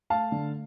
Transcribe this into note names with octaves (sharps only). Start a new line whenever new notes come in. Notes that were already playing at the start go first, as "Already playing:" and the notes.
A3 F5 A5
D3